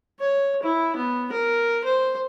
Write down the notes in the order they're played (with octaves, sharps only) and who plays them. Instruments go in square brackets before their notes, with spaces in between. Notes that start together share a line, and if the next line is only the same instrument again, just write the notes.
[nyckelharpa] C#5
E4
B3
A#4
C5